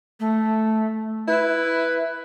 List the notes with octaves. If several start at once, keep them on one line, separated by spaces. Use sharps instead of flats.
A3
E4 B4